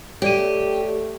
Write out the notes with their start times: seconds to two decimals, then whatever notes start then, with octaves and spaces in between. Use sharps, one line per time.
0.22 A3 G4 C#5 D5 D#7